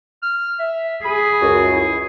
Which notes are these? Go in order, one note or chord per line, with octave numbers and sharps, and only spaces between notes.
F6
E5
G#4 B5
C#2 F#2 F#4
E4